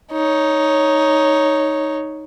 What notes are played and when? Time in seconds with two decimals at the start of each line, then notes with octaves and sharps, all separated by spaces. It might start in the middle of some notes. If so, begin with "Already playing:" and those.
0.12 D#4 C#5